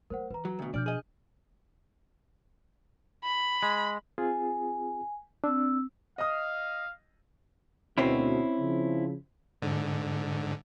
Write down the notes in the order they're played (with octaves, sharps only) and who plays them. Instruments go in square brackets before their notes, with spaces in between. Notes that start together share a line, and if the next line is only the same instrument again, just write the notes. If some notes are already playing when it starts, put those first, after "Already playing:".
[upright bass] F#3 A3 [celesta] A#4 C5 F#5
[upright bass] E3 [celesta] B4 A#5
[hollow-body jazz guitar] F#3
D2 B2
[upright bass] B2 F3 [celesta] D4 F6 G6 [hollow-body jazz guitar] D5
[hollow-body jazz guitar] G#4 D#5
[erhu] B5
[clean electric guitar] G#3
[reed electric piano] C4 F4 G#4 [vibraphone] G#5
[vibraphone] C4 E6 [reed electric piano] D4
[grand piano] D#5 D#6 [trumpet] F5
[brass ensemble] D2 B2 [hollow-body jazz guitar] C4 C#4 E4
[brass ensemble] C#3 F3
[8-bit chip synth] G#2 D3